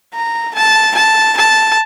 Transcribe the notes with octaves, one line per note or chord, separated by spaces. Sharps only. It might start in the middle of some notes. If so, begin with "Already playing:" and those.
A#5
A5
A5
A5